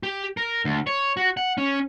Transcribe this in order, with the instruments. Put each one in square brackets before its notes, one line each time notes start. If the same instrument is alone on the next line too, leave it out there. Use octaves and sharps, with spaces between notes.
[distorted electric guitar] G4
A#4
D2
C#5
F#4
F#5
C#4